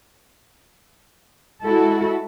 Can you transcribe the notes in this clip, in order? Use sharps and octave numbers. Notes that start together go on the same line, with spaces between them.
G#3 E4 F#4 A4